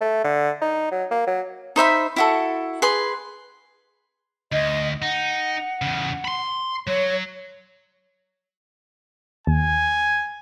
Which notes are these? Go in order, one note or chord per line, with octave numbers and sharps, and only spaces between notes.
A3
D3
D#4
F#3
A#3
F#3
D#4 C5 E5 B5
E4 F#4 A4
G#4 B4 C6
D2 D#5
D#4 F#5
E2 C#3
B5 C6
F#3 C#5
D#2 G#5